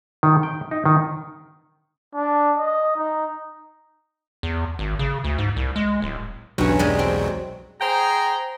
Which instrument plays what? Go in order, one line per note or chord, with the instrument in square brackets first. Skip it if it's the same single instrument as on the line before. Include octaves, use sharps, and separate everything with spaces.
[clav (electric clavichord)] D#3
G5
D#4
D#3
[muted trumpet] D4
D#5
D#4
[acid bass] E2
G#1
C#3
D2
G#2
C2
G#3
D1
[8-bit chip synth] B1 E2 F#3 [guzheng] G2 C#4
[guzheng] G3 G#3 D#5
C4
[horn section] G#4 C5 G5 A#5